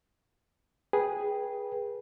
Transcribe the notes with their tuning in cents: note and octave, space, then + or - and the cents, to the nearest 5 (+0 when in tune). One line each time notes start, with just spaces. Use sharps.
G#4 +0 B4 -20 G5 +0